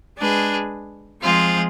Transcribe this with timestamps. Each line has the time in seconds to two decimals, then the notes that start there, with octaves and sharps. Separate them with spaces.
0.18 G#3 D4 G#4 B4
1.21 F3 G#3 C4 F4 G#4